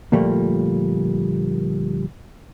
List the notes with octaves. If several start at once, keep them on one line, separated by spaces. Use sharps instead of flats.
D2 A#2 F3 G3 A3 A#3